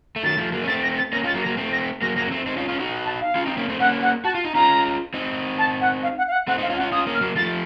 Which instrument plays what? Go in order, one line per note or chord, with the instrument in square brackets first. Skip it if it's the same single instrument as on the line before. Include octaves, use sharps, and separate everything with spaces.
[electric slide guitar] A3
[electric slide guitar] D#3 F#3 [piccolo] A6
[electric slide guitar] F3 A3
F#3 A#3
C#4
[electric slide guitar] A3 C4 [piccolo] A6
[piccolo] A#6
A6
[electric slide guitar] A#3 C#4 [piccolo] A#6
[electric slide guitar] C#4 F4
[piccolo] A6
[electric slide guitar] F#3 A#3
[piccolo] A#6
[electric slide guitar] F#3 A#3
A3 C4
[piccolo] A#6
[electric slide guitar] F#3 A#3 [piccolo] A#6
[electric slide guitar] F#3 A#3 [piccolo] A#6
[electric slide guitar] C#4
A3 C4
C4 D#4
C#4 F4
C#4 F4
D#4 F#4
[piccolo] A5
F5
[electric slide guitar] C#4 F4
C4 D#4
A#3 C#4
A3 C4
[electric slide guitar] A#3 C#4 [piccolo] F#5
[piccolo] F#5
[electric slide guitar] F#4 [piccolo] A5
[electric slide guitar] F4
D#4
[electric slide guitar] C#4 F4 [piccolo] A#5
[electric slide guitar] C4 D#4
[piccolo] A5
F#5
F5
F#5
F5
F#5
[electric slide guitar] A3 C4 [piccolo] F#5
[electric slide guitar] C4 D#4
[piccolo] F5
[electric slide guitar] C#4 F4
[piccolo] F#5
[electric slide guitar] C#4 F4
[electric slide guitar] C#4 F4 [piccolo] D#6
[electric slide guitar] A#3 C#4
[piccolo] F6
[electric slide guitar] F#3 A#3
[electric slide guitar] F3 A3 [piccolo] A6